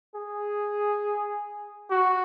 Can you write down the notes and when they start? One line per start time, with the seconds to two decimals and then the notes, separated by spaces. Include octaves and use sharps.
0.15 G#4
1.90 F#4